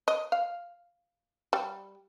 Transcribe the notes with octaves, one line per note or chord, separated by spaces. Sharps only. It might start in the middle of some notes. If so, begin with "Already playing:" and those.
D#5
F5
G3